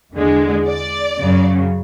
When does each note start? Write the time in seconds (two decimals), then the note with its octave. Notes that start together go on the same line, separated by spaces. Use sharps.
0.13 E2 D3 G#3
0.67 D5
1.20 F#2 C#3 F#3